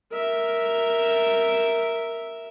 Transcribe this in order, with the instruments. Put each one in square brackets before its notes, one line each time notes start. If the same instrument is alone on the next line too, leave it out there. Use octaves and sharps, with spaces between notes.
[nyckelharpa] A#4 E5